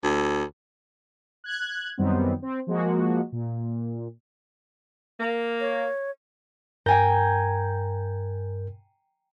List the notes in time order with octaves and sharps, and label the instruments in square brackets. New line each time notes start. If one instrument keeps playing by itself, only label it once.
[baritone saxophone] D2
[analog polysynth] F#6 G#6
F#2 D#3 G3 B3 C4
C4
F3 G#3 A#3 F#4
A#2
[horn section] A#3
[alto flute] C#5
[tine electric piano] G2 A#4 G6 [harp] G5 G#5 A#5